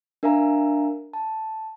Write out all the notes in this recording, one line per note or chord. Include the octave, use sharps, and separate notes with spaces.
D4 A#4 E5 F5 G#5 A#5
A5